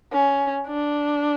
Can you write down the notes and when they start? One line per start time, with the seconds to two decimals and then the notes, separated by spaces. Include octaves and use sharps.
0.13 C#4
0.67 D4